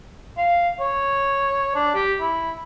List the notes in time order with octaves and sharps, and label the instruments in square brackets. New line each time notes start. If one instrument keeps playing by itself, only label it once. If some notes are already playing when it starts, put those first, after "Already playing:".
[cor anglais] F5
C#5
D4
G4
E4